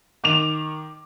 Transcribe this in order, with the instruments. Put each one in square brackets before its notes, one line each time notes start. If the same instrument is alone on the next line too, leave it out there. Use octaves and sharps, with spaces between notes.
[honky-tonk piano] D#3 D6 E7 F7